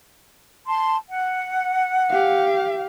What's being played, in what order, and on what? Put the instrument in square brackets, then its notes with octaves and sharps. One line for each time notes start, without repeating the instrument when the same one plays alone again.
[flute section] A5 C6
F#5
[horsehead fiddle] G4 F5